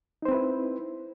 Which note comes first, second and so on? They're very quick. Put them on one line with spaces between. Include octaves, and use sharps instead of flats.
D#4 C5 C4 B4 E4